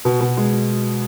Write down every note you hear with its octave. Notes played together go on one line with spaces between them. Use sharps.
B2
B2
G#3